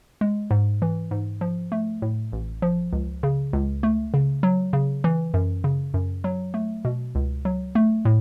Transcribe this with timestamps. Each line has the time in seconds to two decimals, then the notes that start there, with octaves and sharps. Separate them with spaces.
0.21 G#3
0.51 G#2
0.82 E3
1.11 G#2
1.41 F3
1.72 A3
2.02 A2
2.32 A1
2.62 F3
2.93 C#2
3.23 C#3
3.53 C#2
3.83 A3
4.14 C#3
4.43 F#3
4.73 C#3
5.04 E3
5.34 F#2
5.64 C#3
5.94 F#2
6.24 F#3
6.54 A3
6.85 B2
7.15 C#2
7.45 F#3
7.75 A3
8.05 A2